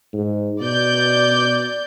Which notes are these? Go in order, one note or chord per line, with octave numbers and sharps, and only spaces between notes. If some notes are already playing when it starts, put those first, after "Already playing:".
G#2
B2 D5 G6